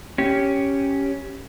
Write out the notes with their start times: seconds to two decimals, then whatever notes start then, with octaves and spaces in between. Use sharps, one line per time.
0.18 C#4 G4